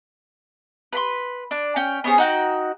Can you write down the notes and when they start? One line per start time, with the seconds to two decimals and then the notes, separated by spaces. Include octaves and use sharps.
0.92 B4 B5 C6
1.51 D4
1.76 C#4 G5
2.04 B3 C#4 G#4 C5
2.18 D#4 F#4 G5